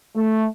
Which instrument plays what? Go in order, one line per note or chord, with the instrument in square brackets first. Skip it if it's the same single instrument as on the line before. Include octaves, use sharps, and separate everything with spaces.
[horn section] A3